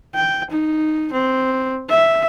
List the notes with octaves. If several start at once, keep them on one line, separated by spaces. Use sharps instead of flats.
G5
D#4
C4
E5